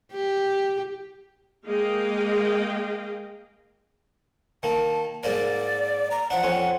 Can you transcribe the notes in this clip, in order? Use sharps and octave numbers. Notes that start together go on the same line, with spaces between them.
G4
G#3 A#3 G#4 D#5 F5 G5
D#3 A#3 A5
G#2 A#3 A#4 D5
A#5
F3 D4 F#5
F2 C4 C#4